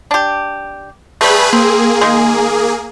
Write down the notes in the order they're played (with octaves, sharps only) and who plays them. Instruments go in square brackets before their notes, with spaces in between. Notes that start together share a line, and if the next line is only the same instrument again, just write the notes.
[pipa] D4 G4
[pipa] G3 A3 [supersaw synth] G#4 B4 B5
[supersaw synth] A#3 G#4 [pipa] C4
[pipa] D#3 G#3